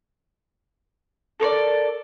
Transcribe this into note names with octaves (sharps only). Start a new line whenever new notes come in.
A4 A#4 C#5 D5